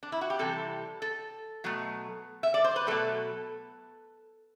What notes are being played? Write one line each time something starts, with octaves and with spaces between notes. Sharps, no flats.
D4
E4
F#4
G4
C3 E3 G3 A4
A4
B2 F#3 A3
E5
D5
C5
B4
B2 F#3 A3 A4